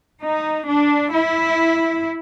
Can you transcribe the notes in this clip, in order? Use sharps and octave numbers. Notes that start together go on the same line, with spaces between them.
D#4
D4
E4